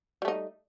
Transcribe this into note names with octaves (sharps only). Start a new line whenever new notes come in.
G3 A3 D#4